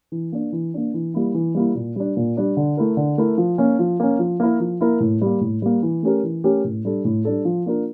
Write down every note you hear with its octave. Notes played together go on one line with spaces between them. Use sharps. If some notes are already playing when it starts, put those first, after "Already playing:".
E3
A#3 D4
E3
A#3 D4
E3
G3 A#3 E4
E3
G3 A#3 E4
A#2
G3 D4
A#2
G3 D4
D3
A3 E4 A#4
D3
A3 E4 A#4
F3
A#3 C#4
F3
A#3 C#4
F3
A#3 E4 A#4
F3
A#3 E4 A#4
A2
G3 A#3
A2
G3 A#3
E3
A3 C#4 G4 A#4
E3
A3 C#4 G4 A#4
A2
G3 D4 A4
A2
G3 D4 A4
F3
A#3 D4 F4 A#4